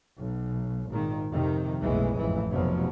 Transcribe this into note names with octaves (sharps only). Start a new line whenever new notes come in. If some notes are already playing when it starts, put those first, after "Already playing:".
B1
G#1 A#2 D#3
F2 C3 D#3
F#1 B1 A2 E3 G#3
A1 F2 E3
F1 B2 F3 F#3